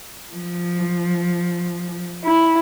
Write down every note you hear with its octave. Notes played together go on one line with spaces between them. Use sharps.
F3
E4